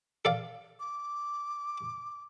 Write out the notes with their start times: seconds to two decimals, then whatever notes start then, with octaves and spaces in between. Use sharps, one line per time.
0.25 A4 D5 F5
0.80 D6